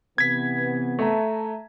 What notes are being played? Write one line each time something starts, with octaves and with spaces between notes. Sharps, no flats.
C3 E3 B3 G#6 B6
A3 E5 A5 A#5